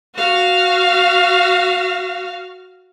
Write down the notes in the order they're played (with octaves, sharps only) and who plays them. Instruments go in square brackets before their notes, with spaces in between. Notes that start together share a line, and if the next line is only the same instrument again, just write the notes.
[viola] F#4 F5